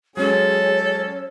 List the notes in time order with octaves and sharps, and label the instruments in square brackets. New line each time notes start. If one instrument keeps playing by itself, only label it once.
[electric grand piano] F#3 G#3 C#4 [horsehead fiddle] G#4 [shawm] A4 [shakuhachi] C#5